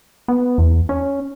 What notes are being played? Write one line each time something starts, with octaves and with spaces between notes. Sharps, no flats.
B3
E2
C#4